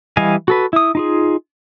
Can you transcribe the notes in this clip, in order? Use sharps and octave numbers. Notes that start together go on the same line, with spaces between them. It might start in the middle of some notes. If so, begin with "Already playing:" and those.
E3 G3 D#5 F5 G#5
F#4 A4 B4
E4 D#6
D#4 F4 G#4